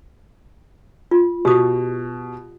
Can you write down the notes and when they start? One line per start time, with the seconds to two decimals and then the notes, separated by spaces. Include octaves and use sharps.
1.11 F4
1.45 B2 G4 D#6